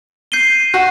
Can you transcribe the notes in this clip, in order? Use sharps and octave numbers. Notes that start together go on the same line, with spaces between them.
G6 C7 D#7 G7
F#4 G6